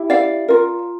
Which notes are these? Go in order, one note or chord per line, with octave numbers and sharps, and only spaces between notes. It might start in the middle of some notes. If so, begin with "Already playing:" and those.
Already playing: E4 G4
D5 F5
F4 A#4